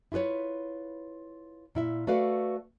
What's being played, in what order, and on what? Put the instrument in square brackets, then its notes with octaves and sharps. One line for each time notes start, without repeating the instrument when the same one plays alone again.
[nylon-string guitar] E4 F4 G4 B4 C#5
A#2 E4 E5
A3 F#4 A4 B4 D5 F5